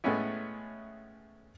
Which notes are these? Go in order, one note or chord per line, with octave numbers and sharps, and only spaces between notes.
A2 G#3 A3 B3 C#4 E4